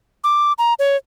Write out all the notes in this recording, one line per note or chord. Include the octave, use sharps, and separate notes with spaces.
D6
A#5
C#5